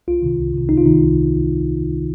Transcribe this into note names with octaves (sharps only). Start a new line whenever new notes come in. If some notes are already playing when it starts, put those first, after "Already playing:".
C2 F4
C3 D#3
C2
C3 D#3
C2 D#4
F4
C3 D#3 D#4
C2